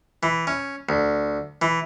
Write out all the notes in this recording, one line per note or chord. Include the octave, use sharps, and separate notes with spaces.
E3
C#4
D2
E3